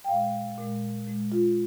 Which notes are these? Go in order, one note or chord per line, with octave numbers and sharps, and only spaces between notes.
G5
A#2 G#3 F5
A#2 G#3
A#2 G#3
F4